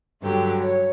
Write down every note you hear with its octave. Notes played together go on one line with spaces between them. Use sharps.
G2 D3 F#3 G4
C#5